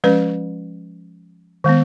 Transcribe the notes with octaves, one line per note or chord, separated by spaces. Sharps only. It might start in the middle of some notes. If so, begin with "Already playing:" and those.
F3 G#3 C#4 B4
D#3 G#3 B3